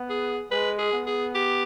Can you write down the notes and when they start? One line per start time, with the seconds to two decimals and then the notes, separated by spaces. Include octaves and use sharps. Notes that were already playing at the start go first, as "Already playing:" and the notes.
Already playing: B3
0.09 G#4
0.51 G#3 B4
0.78 G#4
0.93 B3
1.06 G#4
1.34 G4